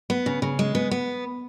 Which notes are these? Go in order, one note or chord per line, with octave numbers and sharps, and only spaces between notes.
B3
C#3
C#3
G#3
B3
B3